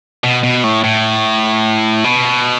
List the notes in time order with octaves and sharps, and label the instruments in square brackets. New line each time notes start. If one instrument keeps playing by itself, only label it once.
[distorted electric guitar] B2
B2
A2
A2
B2